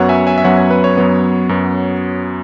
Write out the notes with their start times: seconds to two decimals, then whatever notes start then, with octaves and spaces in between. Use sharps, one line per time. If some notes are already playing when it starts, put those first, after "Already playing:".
Already playing: F#2 F#3 B3 C#5 F#5
0.09 E5 G#5
0.27 E5 G#5
0.38 E5
0.44 F#2 F#3 B3 C#5 F#5
0.57 C#5
0.71 B4
0.84 C#5
0.97 F#2 F#3 B3
1.49 F#2 F#3 B3